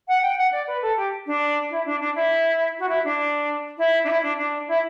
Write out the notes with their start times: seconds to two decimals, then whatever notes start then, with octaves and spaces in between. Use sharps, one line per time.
0.08 F#5
0.22 G5
0.37 F#5
0.52 D5
0.67 B4
0.82 A4
0.97 G4
1.27 D4
1.70 E4
1.86 D4
2.00 D4
2.15 E4
2.79 F#4
2.89 E4
3.04 D4
3.78 E4
4.04 D4
4.08 E4
4.23 D4
4.38 D4
4.68 E4